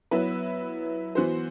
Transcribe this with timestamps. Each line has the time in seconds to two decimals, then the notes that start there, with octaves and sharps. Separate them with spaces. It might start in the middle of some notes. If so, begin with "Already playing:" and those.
0.11 F#3 B3 E4 B4
1.15 E3 B3 F#4 C5